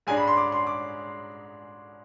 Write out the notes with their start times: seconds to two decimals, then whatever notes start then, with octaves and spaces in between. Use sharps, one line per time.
0.07 G#2 G#3 D4 G#5
0.17 B5
0.27 C6
0.37 D6
0.52 C6
0.67 D6